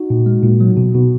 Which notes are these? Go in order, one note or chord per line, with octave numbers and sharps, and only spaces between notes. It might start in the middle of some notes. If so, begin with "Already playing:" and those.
Already playing: D#4 F#4
A#2
G#3
A#2
F#3
B2
B2